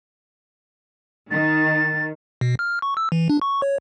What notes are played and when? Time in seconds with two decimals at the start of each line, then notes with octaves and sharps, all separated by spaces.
1.31 D#3 A6
2.41 B2
2.59 F6
2.82 C#6
2.97 E6
3.12 E3
3.29 D4
3.42 C#6
3.62 C#5